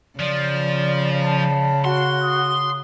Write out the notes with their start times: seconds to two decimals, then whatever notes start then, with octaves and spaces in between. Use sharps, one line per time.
0.19 C#3 F3 D5
1.23 A5
1.85 F#4 F#5 C6
2.22 D#6